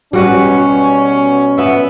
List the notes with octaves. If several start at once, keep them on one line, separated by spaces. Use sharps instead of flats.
B2 G3 C#4 F#4 B4
B3 E5